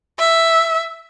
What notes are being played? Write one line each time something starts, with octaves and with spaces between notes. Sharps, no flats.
E5